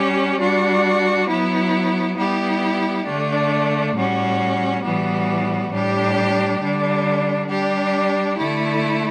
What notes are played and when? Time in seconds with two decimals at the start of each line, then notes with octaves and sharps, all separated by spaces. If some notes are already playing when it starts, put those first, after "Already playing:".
Already playing: G3 C#4 G4
0.40 G3 D4 F#4
1.29 F#3 B3 E4
2.18 G3 B3 E4 G4
3.06 D3 A3 D4
3.95 A2 G3 C#4 F#4
4.84 A2 E3 G3 B3 F#4
5.72 A2 G3 D4 G4
6.60 D3 G3 D4
7.49 G3 D4 G4
8.38 D3 A3 E4